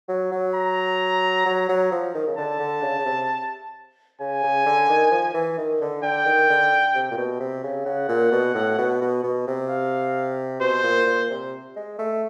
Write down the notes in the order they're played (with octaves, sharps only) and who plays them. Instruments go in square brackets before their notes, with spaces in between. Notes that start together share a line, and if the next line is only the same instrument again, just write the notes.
[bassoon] F#3
F#3
[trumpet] A#5
[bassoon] F#3
F#3
F3
D#3
C#3
[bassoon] D3 [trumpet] A5
[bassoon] D3
C#3
C#3
C3
[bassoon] C#3 [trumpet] G#5
[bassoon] C#3
D3
D#3
F3
E3
D#3
D3
[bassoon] D3 [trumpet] G5
[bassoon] D#3
D3
C3
A#2
B2
C3
C#3
[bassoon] C#3 [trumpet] F#5
[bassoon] A#2
B2
A2
B2
B2
B2
C3
[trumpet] F5
[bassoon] B2 [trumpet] C5
[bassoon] A#2
A#2
C3
G#3
A3